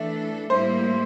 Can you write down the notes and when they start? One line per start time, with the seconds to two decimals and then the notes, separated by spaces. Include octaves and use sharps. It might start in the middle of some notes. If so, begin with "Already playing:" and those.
Already playing: E3 A3 D4 A4 E5
0.50 A2 G3 A#3 E4 C5